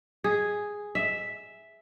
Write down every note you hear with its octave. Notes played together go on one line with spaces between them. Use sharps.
G#4
E5